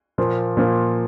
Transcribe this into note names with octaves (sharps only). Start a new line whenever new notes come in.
A#2 F3 A#3
A#2 F3 A#3